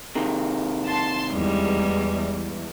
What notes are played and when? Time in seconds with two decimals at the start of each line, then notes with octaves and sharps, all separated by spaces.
0.15 C3 D#3
0.86 A5 C6
1.32 E2 G3 G#3